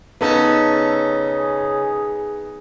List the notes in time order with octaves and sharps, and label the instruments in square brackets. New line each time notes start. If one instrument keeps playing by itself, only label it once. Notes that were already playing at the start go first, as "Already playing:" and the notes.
[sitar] C#3 C#4 A4 [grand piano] B3 D#4
[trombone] G#4